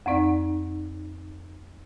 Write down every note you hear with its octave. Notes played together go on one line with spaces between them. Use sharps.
F2 C4 D#4 D5